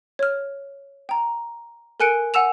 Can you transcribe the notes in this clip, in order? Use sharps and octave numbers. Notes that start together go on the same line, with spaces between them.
C#5 F6
G5 A#5
A4 A#4 G#5 F#6 C#7 D7
F#5 G#5 E6 E7 F7